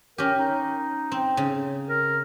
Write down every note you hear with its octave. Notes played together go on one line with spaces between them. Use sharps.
C#4 G4 A#4
D#4
C4
C#3
A#4